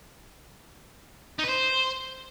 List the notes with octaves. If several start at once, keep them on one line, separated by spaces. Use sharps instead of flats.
D#4
B4
C5